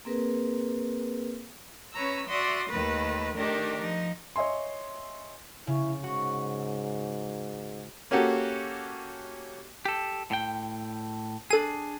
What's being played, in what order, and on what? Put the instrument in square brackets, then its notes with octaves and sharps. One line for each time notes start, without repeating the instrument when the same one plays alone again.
[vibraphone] A#3 C4 G#4 A#4 B4
[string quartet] C#4 B4 C#5 A#5 E6
F#4 D5 E5 C6 D#6
D#2 D#3 A3 B4
D#3 A3 D4 D#4 G4 A#4
F3 D#4
[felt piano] C#5 D#5 E5 G#5 C6
[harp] C#3 [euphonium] E4
[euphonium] G#2 [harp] F#4
[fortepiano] A#3 C#4 F#4 G4 A4
[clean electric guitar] G4 A4
A2 G5
[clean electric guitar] D4 G#4 [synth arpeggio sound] A4 D#7